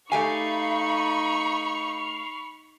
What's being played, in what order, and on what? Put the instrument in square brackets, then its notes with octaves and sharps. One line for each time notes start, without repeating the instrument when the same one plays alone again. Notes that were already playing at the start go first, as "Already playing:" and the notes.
[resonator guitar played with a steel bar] A3 G4 G#5 [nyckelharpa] D#4 [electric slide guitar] F5 [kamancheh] B5 C#6